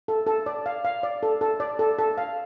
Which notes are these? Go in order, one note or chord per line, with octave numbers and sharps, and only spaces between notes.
A4
A4
D5
F5
F5
D5
A4
A4
D5
A4
A4
F5